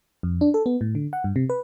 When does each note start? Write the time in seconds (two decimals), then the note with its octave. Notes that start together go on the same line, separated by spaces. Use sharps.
0.23 F2
0.41 D4
0.54 A4
0.66 B3
0.81 A2
0.95 D3
1.13 F#5
1.24 G2
1.36 C3
1.50 B4